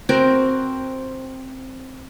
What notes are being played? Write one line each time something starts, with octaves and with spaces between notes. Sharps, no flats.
C4 F#4 A#4